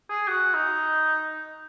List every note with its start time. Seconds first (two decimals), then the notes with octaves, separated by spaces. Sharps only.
0.09 G#4
0.27 F#4
0.54 D#4